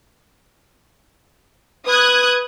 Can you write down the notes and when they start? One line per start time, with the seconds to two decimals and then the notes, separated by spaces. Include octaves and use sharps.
1.86 B4 D#6 F#6 G#6